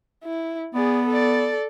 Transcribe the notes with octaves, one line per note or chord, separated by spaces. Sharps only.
E4
B3 G#4 D5
A4 D5